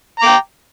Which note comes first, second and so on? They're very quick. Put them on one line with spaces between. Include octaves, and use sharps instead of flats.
A#5 D6 G5